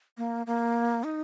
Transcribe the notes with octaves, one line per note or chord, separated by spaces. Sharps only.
A#3
A#3
D#4